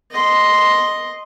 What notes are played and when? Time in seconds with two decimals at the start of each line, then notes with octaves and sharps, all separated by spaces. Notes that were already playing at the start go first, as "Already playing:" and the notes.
0.12 D#5 C6